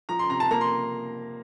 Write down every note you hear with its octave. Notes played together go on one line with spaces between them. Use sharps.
F3 A#5
C6
C3 A#5
A5
A#3 A#5
C6